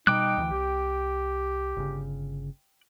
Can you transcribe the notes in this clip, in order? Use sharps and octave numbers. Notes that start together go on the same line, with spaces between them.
B2 G3 D#4 G5 D6 F#6
D2 D#3 E3
C2 G4
G1 C#3